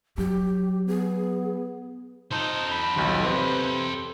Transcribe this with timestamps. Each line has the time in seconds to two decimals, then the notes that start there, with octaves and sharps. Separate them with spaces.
0.18 F#3 G4
0.88 B3 G#4
2.32 D#4 A4 C5
2.71 B5
2.96 D#1 B1
3.24 C3 C4 B4